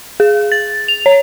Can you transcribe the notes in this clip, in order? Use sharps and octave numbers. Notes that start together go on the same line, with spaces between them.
G#4
A6
F7
C#5